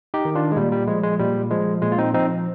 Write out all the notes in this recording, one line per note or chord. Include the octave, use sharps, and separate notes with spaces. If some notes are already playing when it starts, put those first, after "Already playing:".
D#4 G4
D#3
D4 F4
G#3
A#2 G3
G3
F3 G#3
G#3
A#2 G3
F3 G#3
A#2 G#3
F4
C4 D#4
F3 C4 D#4